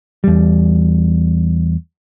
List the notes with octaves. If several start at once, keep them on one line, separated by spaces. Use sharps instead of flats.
E2 G3